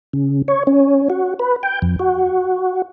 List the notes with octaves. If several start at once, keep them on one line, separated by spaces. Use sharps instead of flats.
C#3
C#5
C#4
F#4
B4
G5
F2
F#4